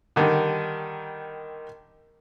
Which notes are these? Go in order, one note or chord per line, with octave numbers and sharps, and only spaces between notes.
D3 D#3 G3